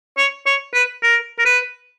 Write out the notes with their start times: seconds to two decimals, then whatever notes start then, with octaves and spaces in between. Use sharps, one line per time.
0.18 C#5
0.46 C#5
0.74 B4
1.03 A#4
1.39 A#4
1.46 B4